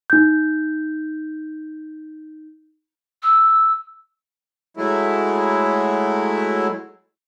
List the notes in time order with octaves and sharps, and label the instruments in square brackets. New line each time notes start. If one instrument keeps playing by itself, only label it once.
[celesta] D#4 G6
[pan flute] E6
[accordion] F#3 G#3 A3 E4